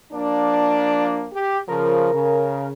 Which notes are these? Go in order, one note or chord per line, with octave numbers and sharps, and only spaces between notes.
F3 A#3 D4
G4
C#3 F3 A#4
C#3